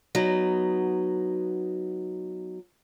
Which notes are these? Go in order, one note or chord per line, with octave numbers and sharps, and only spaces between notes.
F#3 B3 D#4